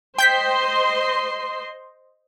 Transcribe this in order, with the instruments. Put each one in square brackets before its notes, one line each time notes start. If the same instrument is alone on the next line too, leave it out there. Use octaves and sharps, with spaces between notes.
[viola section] C5 D#5 C6 [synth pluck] G5 G6 B6